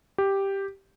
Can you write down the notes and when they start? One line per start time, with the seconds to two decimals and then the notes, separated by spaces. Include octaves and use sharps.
0.18 G4